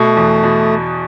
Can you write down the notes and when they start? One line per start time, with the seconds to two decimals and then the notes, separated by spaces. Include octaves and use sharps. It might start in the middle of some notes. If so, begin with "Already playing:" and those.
Already playing: B2 A3
0.17 E2
0.43 B2